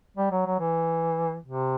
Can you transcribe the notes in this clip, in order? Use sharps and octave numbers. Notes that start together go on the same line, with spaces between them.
G3
F#3
F#3
E3
C3